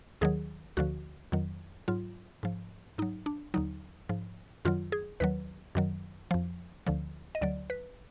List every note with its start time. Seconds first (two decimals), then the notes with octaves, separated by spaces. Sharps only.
0.21 D#2 D#3 F#3 G#4
0.77 D2 D3 F3 F#4
1.32 F2 D#3 F#3
1.88 G#2 F#3 F4
2.43 G#2 F3
2.98 G#2 F#3 D#4
3.26 D4
3.54 D#2 D3 F#3 D#4
4.09 G#2 F3
4.65 F#2 D#3 F#3 F4
4.92 G#4
5.20 D#2 D#3 F#3 B4
5.75 F#2 D#3 F#3
6.31 F2 F3
6.87 D2 D3 F3
7.35 D#5
7.41 D2 D3 F#3 D5
7.70 B4